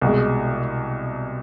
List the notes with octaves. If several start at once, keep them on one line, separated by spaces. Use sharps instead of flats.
C2 B2 G#3